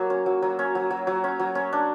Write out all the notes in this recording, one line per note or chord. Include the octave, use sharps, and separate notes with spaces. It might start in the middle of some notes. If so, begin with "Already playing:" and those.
Already playing: F#3 A#3
C#4
F#3
F#3
C#4
F#3
F#3
F#3
C#4
F#3
C#4
D4